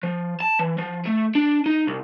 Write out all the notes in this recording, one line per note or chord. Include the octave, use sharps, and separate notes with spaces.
F3
A5
E3
F3
A3
D4
D#4
C2